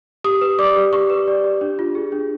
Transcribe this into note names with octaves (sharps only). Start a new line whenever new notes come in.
G4 D#6
B4
D5 D6
G4
G4 C#6
B4
D5
G4
D4
F4
G#4
D4